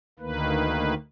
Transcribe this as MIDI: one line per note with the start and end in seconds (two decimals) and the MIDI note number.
0.19 0.94 38
0.19 0.94 51
0.19 0.94 58
0.19 0.94 71